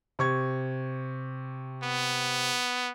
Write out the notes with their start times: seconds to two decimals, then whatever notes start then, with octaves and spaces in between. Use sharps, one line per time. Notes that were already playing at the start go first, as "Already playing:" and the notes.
0.19 C3 C#6 G#6
1.84 B3